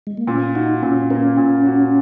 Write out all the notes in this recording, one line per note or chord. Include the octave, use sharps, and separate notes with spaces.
G#3
A#3
A#2 C#4
D#4 F#4
A#2 C#4
A#3 C#4
A#2
F#4